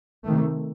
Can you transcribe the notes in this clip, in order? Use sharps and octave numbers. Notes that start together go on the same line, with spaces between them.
C3 D#3 A3